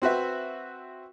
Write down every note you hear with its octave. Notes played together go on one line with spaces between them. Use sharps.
C4 F#4 B4 E5